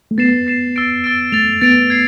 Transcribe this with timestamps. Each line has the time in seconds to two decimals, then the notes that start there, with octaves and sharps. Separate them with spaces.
0.11 A3
0.18 B3 A6 C7 E7
0.47 A6 C7 E7
0.76 E6 A6 D7
1.04 E6 A6 D7
1.32 A3 A6 D7 F7
1.61 B3 A6 D7 F7
1.90 G#6 C7